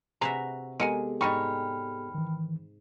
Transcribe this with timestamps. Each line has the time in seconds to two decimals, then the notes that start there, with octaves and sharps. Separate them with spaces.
0.21 C3 F#4 G#4 B4 E5 A#5
0.80 G#3 B3 G4 A4 A#4 F#5 G#5
1.21 G#2 G3 G#3 D#4 G5 B5 C#6 F6
2.15 D#3 E3